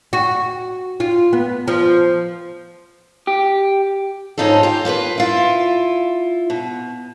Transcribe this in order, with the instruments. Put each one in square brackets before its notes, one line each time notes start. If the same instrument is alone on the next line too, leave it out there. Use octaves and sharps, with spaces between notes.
[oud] F#4
F4
B3
F3
[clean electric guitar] G4
[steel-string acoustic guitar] G#2 C#4 D#4 F4 A4
F4 G4
A#3 F4 F#4 B4
E4 F4
B2